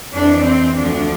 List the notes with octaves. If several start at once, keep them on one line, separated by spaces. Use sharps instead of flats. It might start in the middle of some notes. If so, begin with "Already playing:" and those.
F2 E3 D4
C4
D2 D3 F3 D4